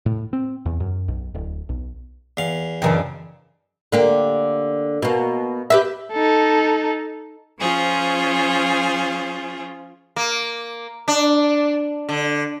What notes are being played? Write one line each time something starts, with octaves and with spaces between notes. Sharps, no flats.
A2
C4
E2
F#2
B1
D1
B1
E2 F5
F#2 C#3 E3 D4 A#4 D#5 G5
D3 A#3 G4
B2 A#3
G4 B4 E5
D#4 A4
F3 C#4 F4 G#4 C5
A#3
D4
D3